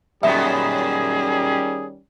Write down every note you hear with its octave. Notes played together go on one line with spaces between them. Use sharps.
F#2 A#2 D#3 G3 B3 C#4 G#4 E5